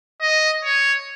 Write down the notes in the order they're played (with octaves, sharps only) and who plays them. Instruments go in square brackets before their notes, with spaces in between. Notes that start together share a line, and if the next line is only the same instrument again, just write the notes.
[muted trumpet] D#5
C#5